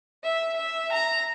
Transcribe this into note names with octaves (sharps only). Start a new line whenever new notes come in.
E5
E5
A#5